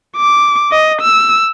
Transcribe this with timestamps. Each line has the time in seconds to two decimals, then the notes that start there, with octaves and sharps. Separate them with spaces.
0.17 D6
0.72 D#5
1.02 E6